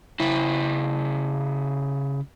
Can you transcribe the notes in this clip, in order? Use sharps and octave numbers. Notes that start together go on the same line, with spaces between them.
C#3 E4